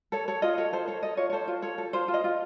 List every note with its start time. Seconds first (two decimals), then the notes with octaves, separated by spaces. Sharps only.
0.12 A4 C#5
0.28 A4 C#5
0.42 F4 D#5
0.58 A4 C#5
0.73 A4 C5
0.87 A4 C#5
1.03 A4 D#5
1.17 F4 C#5
1.30 C#5
1.33 A4 C5
1.48 F4
1.62 A4 C#5
1.78 A4
1.93 F4 C5
2.08 F4
2.14 D#5
2.24 F4